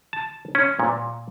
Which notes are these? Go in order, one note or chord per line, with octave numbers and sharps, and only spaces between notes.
A5
C#4
A#2